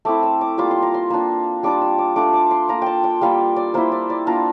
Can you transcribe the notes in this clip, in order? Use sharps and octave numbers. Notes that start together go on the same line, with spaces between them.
A3 C4 E4 D6
E6
D6
G3 A#3 F4 D6
C6
A#5
C6
A#3 D4 F4
G3 D4 F4 D6
E6
D6
A3 D4 F4 D6
D6
C6
A#3 F4 A#5
G5 A5
G5
G3 A#3 F4 F5
D5
A#3 E4 C5
D5
D5
A#3 D4 F4 A#5